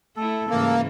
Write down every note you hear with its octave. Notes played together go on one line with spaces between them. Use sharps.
A3 E4 A4
G#2 C#3 E3 A#3